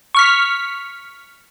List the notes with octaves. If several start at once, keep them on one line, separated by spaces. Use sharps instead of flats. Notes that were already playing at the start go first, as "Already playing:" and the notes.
C#6 F6 B6